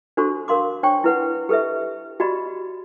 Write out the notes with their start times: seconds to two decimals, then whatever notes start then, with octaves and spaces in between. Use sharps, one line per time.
0.17 D4 F#4 A4 C5 C#6
0.48 A#4 F5 C6 D6
0.83 D4 C5 C#5 G5 C#6
1.04 E4 B4 F#5
1.49 G4 A4 B4 D#5 E5
2.20 F#4 G4 D5 D#5 B5